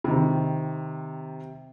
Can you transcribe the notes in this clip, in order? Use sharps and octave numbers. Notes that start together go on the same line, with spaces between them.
C3 D#3